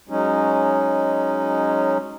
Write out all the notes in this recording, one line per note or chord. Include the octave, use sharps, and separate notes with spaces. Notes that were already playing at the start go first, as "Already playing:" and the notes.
F#3 G#3 C#4 D#4